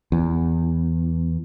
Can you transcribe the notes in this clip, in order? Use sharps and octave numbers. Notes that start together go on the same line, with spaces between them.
E2